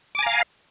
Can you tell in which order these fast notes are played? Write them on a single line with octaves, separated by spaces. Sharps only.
D6 G#5 A#5 F5